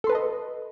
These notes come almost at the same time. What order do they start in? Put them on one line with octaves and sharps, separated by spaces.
A4 C6 B4 A5 D#5